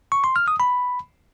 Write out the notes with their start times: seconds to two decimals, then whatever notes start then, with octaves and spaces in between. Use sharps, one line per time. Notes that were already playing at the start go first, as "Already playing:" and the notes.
0.12 C#6
0.24 C6
0.36 F6
0.48 D#6
0.60 B5